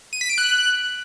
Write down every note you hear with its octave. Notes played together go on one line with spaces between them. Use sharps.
D#7
B6
D7
F#6